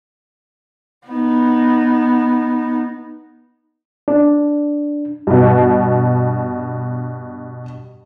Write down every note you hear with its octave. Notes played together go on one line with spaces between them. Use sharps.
B3 D#4
D4
G2 B2